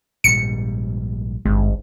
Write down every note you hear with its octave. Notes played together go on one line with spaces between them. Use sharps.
A#1 G#2 G3 C#7
G#1 G2 G#3